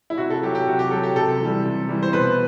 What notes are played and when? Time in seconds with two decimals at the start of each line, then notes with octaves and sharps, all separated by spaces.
0.10 E4
0.18 C3 F#4
0.30 A4
0.43 F#3 G4
0.55 G4
0.67 C3 F#4
0.79 G4
0.91 F#3 A4
1.04 G4
1.15 C3 A4
1.41 E3 G3
1.65 C3
1.88 E3 G3
2.03 C5
2.13 B2 B4